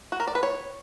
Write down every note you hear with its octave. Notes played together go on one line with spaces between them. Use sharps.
F#4
A#4
D5
B4
C#5